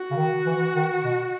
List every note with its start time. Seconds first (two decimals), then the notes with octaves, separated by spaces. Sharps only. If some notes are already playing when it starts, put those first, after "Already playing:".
Already playing: F#4
0.11 C#3
0.16 D#3
0.46 E3
0.75 D#3
1.04 B2